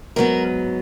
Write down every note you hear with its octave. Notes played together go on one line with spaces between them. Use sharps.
G#2 F#3 B3 A#4